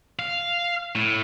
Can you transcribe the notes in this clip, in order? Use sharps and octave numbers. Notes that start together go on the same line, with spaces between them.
F5
A2